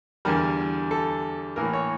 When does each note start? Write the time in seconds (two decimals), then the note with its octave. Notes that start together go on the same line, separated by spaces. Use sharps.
0.25 E2 D3 G3 A#4
0.91 A4
1.56 A2 E3 A#3 A#4
1.73 C#5